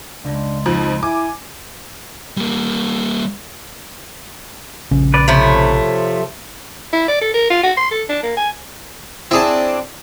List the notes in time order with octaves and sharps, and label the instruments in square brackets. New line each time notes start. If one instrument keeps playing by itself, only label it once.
[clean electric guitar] C#2 [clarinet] G#3 [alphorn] D4
[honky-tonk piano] F2 F3 [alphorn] D#4
[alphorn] E4 [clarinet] G#5 [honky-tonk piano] D6
[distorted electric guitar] G3 A#3
[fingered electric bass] A#1 C#3 C#4
[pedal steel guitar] B4 D5
[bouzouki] C3 A3 [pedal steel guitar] F3 C#5 B5
[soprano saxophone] E4
D5
A4
A#4
F4
F#4
C6
A4
D4
A#3
G#5
[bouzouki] C4 D4 [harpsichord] E4 G#4 A5